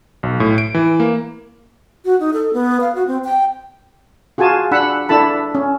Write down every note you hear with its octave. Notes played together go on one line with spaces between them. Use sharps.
B1
A2
D7
E3
A#3
F#4
D#4
A4
B3
F5
F#4
C4
G5
F4 F#4 G#4 G#5 A5
D4 F#5 B5 E6
D4 E4 A4 A5 B5
C#4